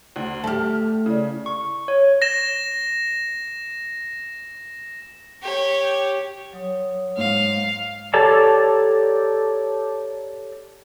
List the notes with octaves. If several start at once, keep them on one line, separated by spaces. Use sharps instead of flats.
D2
A3 G4 A5 F6
C#3 E4 D5
C#6
C#5
A#6 E7
G4 C#5
F#3 C#5 D#6
G#2 F5
G4 A4 C#5 D5 A5 A#5